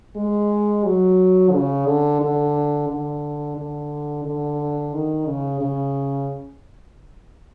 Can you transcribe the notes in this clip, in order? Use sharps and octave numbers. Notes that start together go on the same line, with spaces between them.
G#3
F#3
C#3
D3
D3
D3
D3
D3
D#3
C#3
C#3